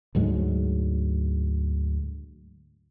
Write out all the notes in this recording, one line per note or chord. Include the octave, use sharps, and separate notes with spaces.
D2 G#2 F#3 G#3